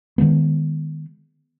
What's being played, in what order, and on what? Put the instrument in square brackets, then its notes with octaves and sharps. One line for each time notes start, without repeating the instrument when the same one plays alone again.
[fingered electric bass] D#3 F3 G#3 B3